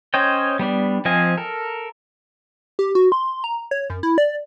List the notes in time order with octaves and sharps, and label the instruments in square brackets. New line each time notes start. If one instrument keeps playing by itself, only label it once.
[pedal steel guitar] C#4 C5 C#5 D#5 G5
G3 B3 D4
F3 C4 D#5 F5 G#5
A4 A#4
[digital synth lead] G4
F#4
C6
A#5
C#5
F#2
E4
D5